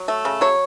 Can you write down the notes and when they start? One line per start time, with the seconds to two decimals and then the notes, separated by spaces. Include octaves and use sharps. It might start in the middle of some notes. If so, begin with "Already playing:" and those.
Already playing: F#3
0.08 A3
0.25 C#3
0.41 F#3 C#5